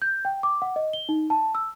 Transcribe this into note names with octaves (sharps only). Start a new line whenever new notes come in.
G6
G5
D6
F#5
D#5
G7
D#4
A5
E6